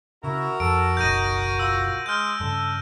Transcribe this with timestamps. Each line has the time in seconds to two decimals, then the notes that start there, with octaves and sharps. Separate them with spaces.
0.24 C#3 E4 F#4 A#4
0.60 F2 A4 D7
0.97 F#1 B1 D#4 G6 A#6 D#7
1.59 F4 E6
2.06 G#3 F6 G6
2.40 G2 C#3 A4